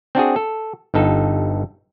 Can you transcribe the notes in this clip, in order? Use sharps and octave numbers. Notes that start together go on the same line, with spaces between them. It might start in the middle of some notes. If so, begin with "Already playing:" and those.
C4 D4 F#4 G#4
A4
G1 G2 D#4 A4